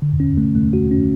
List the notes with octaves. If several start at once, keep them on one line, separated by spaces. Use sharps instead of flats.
D3
C#4
A3
A3
F#4
C#4